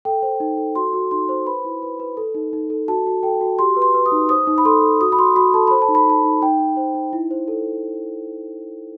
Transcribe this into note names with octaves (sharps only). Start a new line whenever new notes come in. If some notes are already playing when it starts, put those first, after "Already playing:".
A4 G5
C5
D#4
A4
F#4 C6
F#4
D#4 C6
C5
B4 B5
E4
B4
B4
A4
D#4
D#4
A4
F#4 A5
F#4
A4 G5
F#4
G4 C6
B4
C6
B4
D#6
D#4
C5 D#6
D#4
B5
A4 C6
A4
F#4 D#6
B5
F#4 C6
F#4 B5
A4 A5
C5 B5
A5
D#4
B5
D#4 A5
D#4
D#4 G5
D#4
C5
D#4
E4
C5
A4